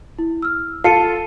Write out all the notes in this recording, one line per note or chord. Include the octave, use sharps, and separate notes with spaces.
E4
E6 F6
F4 A4 C7 C#7 D#7